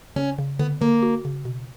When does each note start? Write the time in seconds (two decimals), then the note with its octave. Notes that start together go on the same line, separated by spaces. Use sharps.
0.16 C#3 C#4
0.38 C#3
0.59 D3 B3
0.81 D3 A#3
1.03 F#4
1.25 C#3
1.45 B2